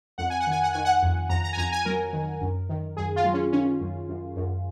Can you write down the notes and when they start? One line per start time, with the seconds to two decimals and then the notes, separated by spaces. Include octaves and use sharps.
0.18 F2 F#5
0.30 G#5
0.40 F#5
0.47 D#3 G#5
0.63 F#5
0.73 D#3 G#5
0.85 F#5
1.03 F2
1.29 F2 A#5
1.44 A#5
1.53 G#5
1.58 F2 A#5
1.72 G#5
1.85 F#3 A#4
2.13 D#3
2.41 F#2
2.69 D#3
2.97 F#2 G#4
3.16 F4
3.25 F#3
3.34 C#4
3.52 D#3 C#4
3.81 F#2
4.09 F#2
4.36 F#2